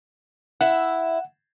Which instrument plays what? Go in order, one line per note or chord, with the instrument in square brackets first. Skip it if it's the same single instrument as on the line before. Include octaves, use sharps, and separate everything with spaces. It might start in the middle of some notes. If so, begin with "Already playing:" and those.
[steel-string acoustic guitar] E4 E5 [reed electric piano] F#5